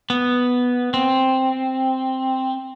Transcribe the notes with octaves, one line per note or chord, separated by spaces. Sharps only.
B3
C4